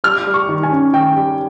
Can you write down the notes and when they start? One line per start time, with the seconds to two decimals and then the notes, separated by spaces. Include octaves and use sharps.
0.04 G3 F6
0.27 G3
0.34 C#6
0.49 D#3
0.63 G#5
0.71 C#4
0.93 D#3 G5
1.16 G3